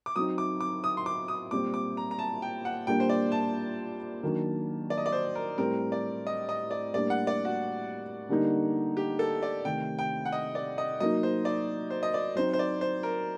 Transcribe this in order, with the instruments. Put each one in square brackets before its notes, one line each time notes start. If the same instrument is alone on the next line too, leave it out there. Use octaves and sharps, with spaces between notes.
[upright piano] D6
[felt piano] F#3 C4 D#4 [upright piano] D#6
[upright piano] D6
D6
D#6
C6
D6
D#6
[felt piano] A#2 G3 C4 [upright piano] D6
[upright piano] D6
A#5
A#5
A5
G5
F#5
[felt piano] A#2 G3 A#3 D4 [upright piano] G5
[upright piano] C5
D5
A5
[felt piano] D#3 F#3 A#3 D4
[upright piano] D5
D#5
D5
C5
A#4
[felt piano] A2 G3 C4 [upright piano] A#4
[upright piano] D5
D#5
D#5
D5
[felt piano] A2 G3 A#3 D4 [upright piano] D5
[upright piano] F#5
D5
F#4
[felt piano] D3 G3 A#3 D#4
[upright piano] G4
A4
D5
[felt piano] C3 D#3 A3 [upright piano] G5
[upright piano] G5
F#5
D#5
D5
D#5
[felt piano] F#3 A#3 D#4 [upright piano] D#5
[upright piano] C5
D5
C5
D#5
D5
[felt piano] F#3 C4 D#4 [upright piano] C5
[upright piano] C5
D5
C5
A#4